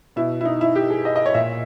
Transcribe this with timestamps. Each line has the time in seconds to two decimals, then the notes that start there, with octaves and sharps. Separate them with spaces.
0.16 B2 E4
0.41 E4
0.45 D#4
0.61 E4
0.76 G4
0.90 G#4
1.05 D#5
1.16 D#5
1.26 C#5
1.34 A#2 E5